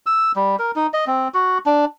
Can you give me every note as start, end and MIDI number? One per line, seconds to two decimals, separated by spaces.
0.06 0.32 88
0.36 0.56 55
0.59 0.71 70
0.76 0.87 63
0.94 1.05 75
1.07 1.28 60
1.34 1.58 66
1.66 1.85 62